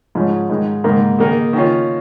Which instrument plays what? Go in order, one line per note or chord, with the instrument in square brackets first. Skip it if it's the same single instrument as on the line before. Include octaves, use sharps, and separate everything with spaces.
[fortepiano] G#2 F3 G#3 C#4
G#2 D#3 G#3
G#2 D#3 A#3
D#3 A#3 D#4 G#4
D#3 C#4 F4